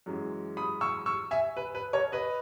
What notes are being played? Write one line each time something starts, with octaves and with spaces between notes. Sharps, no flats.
F#2 E3 G#3
B5 D#6
C#6 E6
C#6 E6
E5 G#5
B4
B4
A#4 C#5
B4 D#5